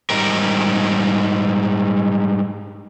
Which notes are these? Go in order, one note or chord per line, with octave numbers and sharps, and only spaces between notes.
G#2 G3 A#4